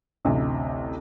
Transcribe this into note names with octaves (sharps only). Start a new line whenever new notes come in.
A1 D2 C3